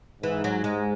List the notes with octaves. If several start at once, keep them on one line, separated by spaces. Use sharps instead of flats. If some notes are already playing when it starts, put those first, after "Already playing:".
G#2 E3
F#3
G#3